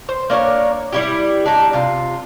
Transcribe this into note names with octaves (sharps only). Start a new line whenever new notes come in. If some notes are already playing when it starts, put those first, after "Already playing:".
C5
A#3 D4 A#4 C#5
G3 E4 G4
D4 D#4
C3 F4